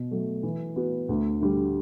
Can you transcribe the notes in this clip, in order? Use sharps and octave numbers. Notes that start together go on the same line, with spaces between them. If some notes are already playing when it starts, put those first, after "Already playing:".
Already playing: B2
F#3 A3
E3
B3 F#4
D2
D3 G3